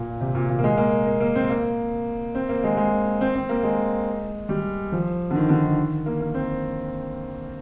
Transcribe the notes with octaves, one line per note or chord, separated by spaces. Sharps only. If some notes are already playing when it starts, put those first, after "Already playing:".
Already playing: A#2
C3
A#2
A#2
A#3
G#3
A#3
A#3
A#3
C4
A#3
C4
A#3
G#3
G#3
C4
C4
A#3
G#3
G3
F3
D3
D#3
D3
D#3
D#3
A#3
A#3
C4